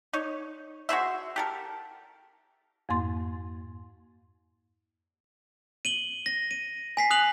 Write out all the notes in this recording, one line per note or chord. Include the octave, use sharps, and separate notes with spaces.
D#4 C#5
F#4 G#4 C5 E5
G4 A4 A#4
F2 G#2 A#3 C6 A6
D#7 F#7 G7
A#6
D#7
G#5 B6 C7
D#6 F#6 F7 F#7